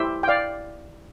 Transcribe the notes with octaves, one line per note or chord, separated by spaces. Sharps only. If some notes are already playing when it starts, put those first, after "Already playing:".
Already playing: E4 G4 C5 E5
G5
D5 F5